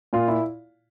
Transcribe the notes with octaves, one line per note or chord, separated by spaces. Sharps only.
A#2 F4
E4